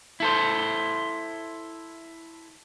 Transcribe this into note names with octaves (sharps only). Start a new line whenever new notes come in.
E4 A4 C5